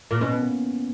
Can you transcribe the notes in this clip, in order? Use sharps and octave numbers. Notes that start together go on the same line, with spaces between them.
A#2
B2 C#4 E4
B3
A#3